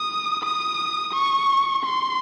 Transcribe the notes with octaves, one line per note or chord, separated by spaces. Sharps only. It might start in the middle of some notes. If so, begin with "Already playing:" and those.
Already playing: D#6
D#6
C#6
C6